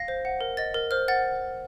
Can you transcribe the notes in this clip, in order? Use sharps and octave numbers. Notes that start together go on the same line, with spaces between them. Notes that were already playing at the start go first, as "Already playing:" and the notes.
Already playing: F5 A#6
C5
F#5
A#4
D#5 A6
A#4
C5 F6
F#5 A6